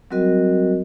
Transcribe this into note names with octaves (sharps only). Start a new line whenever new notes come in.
F#3 G3 C4 F#4 A#4 D#5